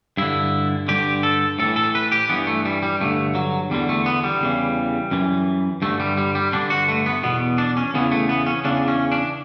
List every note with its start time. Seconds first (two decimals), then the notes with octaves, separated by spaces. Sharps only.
0.17 G2 D3 E4
0.88 G2 D3 G4
1.23 A4
1.59 A2 E3 A4
1.76 A4
1.95 B4
2.12 G4
2.29 G2 E3 B3
2.47 A3
2.65 G3
2.83 G3
3.00 G2 D3 A3
3.35 F#3
3.70 E2 D3 G3
3.89 A3
4.06 B3
4.24 G3
4.41 E2 C#3 E3
5.11 F#2 E3
5.82 G2 D3 A3
6.00 G3
6.17 G3
6.35 G3
6.53 G2 D3 D4
6.70 F#4
6.88 A3
7.06 B3
7.23 E2 B2 B3
7.58 D4
7.77 C#4
7.94 E2 C#3 E3 B3
8.12 A3
8.29 B3
8.46 C#4
8.65 E2 C#3 E3 D4
8.88 C#4
9.12 D4